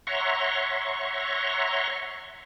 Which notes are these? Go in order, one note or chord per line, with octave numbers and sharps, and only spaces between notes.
C#5 E5 F#5 A#5 C6 C#6